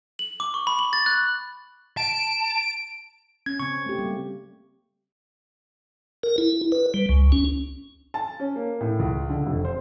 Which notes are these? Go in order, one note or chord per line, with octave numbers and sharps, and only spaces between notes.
F#7
D6
C#6
B5
F#7
A6
F#6
A5 D7
C#4 G#6
C#3 C4 C#6
A3 G4
G3 A#3 C4
A#4
E4
B4
G3
C#2
C#4
A5
C#4
A#3
A2
C#2
D3
F1
C5